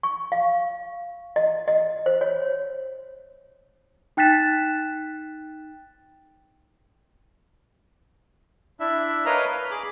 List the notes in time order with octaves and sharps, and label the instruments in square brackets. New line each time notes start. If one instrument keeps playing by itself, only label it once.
[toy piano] C#6
F5
D#5
D#5
C5
C#5
[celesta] D#4 G5 F#6 A6 B6 E7
[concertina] D4 E4 E5
A#4 B4 C#5 D#5 F5 A#5
B4
G#4 B5 D6